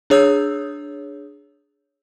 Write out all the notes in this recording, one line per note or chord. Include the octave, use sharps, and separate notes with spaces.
D4 G#4 C#5 D#6 E6 G6